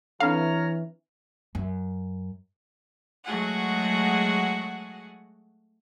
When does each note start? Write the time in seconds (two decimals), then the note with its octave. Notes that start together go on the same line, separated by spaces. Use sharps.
0.20 E3 C4 D4 A4 C#5 F5 A#5 F6
1.55 F#2
3.25 F#3 G#3 A3 F#4 G#4 F#5